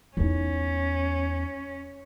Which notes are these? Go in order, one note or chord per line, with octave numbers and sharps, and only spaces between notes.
E2 C#4 D#4